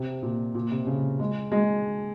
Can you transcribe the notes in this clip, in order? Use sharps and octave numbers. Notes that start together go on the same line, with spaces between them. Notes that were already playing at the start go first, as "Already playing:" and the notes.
Already playing: C3
A#2
A#2
C3
C#3
G#3
G#3